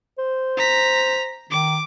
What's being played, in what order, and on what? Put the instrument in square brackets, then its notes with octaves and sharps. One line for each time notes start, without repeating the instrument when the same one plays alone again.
[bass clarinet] C5
[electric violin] A#5 B6
[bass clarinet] D#3 [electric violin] D6